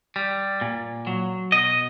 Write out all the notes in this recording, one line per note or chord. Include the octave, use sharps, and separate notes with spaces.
G3
A#2
F#3
B2 D#5